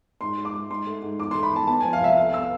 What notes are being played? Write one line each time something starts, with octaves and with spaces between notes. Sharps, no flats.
G#2 C6
G#3
D6
G#2
G#2 C6
A3
G#2
E2 D6
A3 C6
B5
E2 A5
B3 A5
F3 G#5
F5
C2 E5
A2 F5
B3 E6